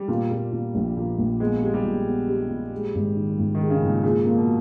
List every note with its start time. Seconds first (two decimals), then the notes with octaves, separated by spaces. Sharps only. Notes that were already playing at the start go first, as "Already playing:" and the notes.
Already playing: G3
0.08 A#2
0.31 A#2
0.52 A#2
0.75 A#1
0.96 A#2
1.18 A#1
1.40 G#3 B3
1.62 G#3 G4
1.74 G3
1.85 A#2
2.06 B3
2.29 G4
2.50 A#2
2.72 G#3
2.94 G#1
3.16 D#3
3.38 G#1
3.55 D#3
3.60 G#3
3.70 C#3
3.82 G#1
3.87 A#2
3.98 B2
4.03 A#2 G#4
4.26 A#3
4.36 B2